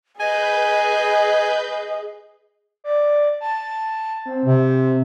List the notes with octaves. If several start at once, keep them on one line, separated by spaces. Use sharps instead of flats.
G#4 B4 D#5 G#5 G6
D5
A5
C4
C3